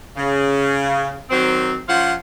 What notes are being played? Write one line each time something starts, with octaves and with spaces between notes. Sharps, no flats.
C#3
D#3 F#3 C4
F3 C#4 C5 F5 F#5